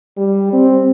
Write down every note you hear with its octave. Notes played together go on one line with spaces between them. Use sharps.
G3
C4